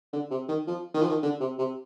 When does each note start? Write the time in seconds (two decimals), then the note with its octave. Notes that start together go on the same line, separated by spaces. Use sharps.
0.13 D3
0.31 C3
0.49 D#3
0.67 F3
0.94 D#3
1.02 F3
1.09 D#3
1.23 D3
1.40 C3
1.59 C3